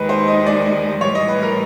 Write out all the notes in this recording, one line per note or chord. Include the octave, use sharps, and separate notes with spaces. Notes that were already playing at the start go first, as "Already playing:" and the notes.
Already playing: D#2 D#3 G#3 B4
C5
D#5
D5
A2 E3 G3 C#5
D#5
B4
A#4